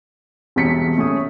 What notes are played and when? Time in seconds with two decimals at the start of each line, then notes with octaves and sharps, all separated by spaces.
0.56 E1 C2 B6 C#7
0.98 A3 C#4 D#6